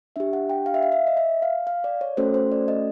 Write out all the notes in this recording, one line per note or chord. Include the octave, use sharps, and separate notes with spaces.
D4 G4 E5
F#5
G5
F5
E5
F5
E5
D#5
E5
F5
F5
D5
C#5
A3 C#4 F#4 A4 C5
C5
D5
D#5